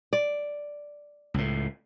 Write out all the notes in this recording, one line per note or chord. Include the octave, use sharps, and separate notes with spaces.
D5
C#2 A2